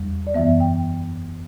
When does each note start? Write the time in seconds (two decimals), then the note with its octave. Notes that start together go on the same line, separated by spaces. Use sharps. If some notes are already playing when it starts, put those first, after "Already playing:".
Already playing: E2 G3
0.27 D5
0.34 F#2 E3 B3 E5
0.60 G5